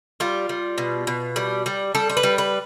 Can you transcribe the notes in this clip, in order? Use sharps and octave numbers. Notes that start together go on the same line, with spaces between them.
G3 F4
G3
B2
B2
G3
G3
G3 A4
C5
B4
G3
B4